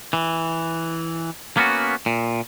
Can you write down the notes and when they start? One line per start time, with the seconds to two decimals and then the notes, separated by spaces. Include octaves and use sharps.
0.13 E3
1.57 A#3 B3 C#4 F#4
2.06 A#2